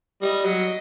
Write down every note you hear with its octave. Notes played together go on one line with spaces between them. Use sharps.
G3 D#5
F#3